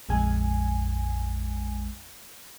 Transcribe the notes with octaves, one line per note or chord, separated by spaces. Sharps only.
A#1 F2 G#3 G#5